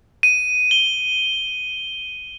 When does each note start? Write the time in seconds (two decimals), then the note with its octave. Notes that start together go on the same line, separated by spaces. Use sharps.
0.23 D#7
0.71 G7